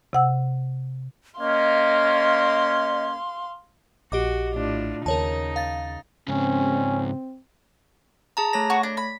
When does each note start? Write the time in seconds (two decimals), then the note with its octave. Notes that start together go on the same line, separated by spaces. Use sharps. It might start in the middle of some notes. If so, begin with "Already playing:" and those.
0.13 C3 F#5 E6
1.39 A#3 C#4 D#5 F5 C6
4.12 A#1 F#4 G4 D#5 D6
4.54 A2 D4 F4
5.06 D#2 C#3 D#4 A#4 C#5 A5
5.56 F5 A6
6.28 G#2 C#3 C4 C#4
8.37 G#4 A5 A#5
8.53 A3 C#5 A#6
8.70 F#4
8.83 D4
8.97 B5